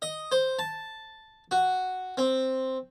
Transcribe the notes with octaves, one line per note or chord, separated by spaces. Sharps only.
D#5
C5
A5
F#4
C4